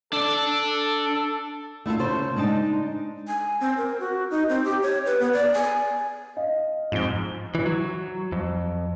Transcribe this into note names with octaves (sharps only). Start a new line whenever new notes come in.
D4 A4 D5
A3 E4 F4 A4
C#3 A4 C5
G#3 D4 D#4 A5
G#5
C4
A#4
F#4
D#4
C4
G4
C#5
B4
B3
D5
G#5
D#5 F5
F2 G#2 D7 G7
E3
F#3
F2